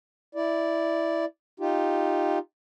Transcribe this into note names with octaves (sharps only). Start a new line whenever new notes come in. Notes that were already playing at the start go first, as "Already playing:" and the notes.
E4 D5
D#4 F4 G4